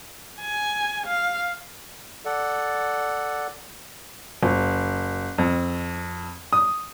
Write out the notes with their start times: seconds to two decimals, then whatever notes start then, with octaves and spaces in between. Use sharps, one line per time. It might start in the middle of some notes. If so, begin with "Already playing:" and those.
0.41 G#5
1.07 F5
2.25 A4 D5 F#5
4.43 F#1
5.38 F2
6.53 D#6